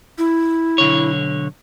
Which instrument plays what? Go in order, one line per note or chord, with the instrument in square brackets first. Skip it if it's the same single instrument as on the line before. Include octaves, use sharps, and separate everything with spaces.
[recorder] E4
[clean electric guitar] B1 D3 C#5